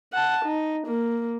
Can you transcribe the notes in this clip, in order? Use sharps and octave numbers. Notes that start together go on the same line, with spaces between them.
F#5 A5
D#4
A#3